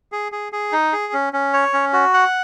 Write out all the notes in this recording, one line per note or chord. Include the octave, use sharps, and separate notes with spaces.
G#4
G#4
G#4
D#4
G#4
C#4
C#4
C#5
C#4
F#4
F#5